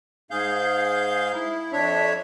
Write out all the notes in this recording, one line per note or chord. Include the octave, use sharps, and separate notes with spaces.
G#2 G#4 F5 G6
E4
F2 D4 C#5 E5